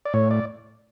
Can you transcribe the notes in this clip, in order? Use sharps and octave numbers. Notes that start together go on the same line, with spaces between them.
D5
A2 C#5
D5